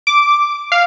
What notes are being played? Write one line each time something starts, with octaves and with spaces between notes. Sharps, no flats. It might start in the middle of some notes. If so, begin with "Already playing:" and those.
D6
F5